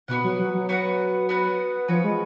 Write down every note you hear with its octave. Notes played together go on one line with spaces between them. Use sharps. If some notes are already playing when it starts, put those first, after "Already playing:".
B2 B3 F#4 B4 F#5
F#3
F#3
F#3
B3 F#4 B4 F#5
B3 F#4 B4 F#5
F3 C#4 F#4 B4
G#3